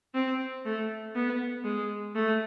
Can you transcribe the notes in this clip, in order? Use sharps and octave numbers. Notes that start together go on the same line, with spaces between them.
C4
A3
B3
G#3
A3